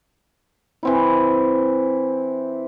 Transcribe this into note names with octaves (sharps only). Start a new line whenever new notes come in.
E3 C4 E4